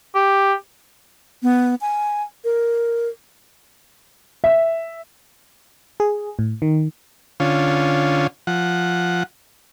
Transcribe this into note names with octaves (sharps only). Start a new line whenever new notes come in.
G4
B3
G#5
A#4
E5
G#4
A2
D#3
D3 C#4 F4
F3 F#5